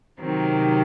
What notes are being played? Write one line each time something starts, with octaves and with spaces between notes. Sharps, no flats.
C3 D#3 F#3 C4